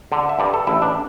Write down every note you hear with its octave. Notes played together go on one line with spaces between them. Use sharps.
D3
E5
G2 D5
A4
A1 E4
D4